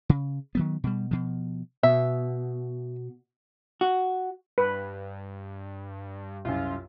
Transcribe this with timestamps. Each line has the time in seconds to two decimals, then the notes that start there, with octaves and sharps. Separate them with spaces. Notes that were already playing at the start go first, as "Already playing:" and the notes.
0.09 C#3
0.55 D#3 F#3 B3
0.84 B2 G3
1.11 B2 F3
1.83 B2 E5
3.81 F#4
4.58 G2 B4
6.45 C2 F#2 F4